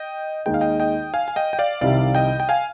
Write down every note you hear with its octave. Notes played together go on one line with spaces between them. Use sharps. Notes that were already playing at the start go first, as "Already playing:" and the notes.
Already playing: D#5 G5
D#2 D#3 G#3 D#4 G5
F5
D#5 G5
D#5 G5
F5 G#5
G#5
D#5 G5
G5
D5 F5
C2 C3 D#3 G3 D5 F5
D#5 G5
G5
F5 G#5